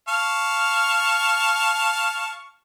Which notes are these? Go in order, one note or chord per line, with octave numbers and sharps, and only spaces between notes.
F5 A5 C#6